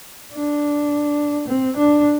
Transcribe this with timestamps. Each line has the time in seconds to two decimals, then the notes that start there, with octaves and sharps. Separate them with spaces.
0.33 D4
1.47 C4
1.76 D4